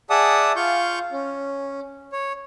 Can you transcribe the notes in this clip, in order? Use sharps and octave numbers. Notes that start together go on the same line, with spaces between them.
G#4 D5 E5 F#5 A5 D#6
F4 F5 C#6 G6
C#4
C#5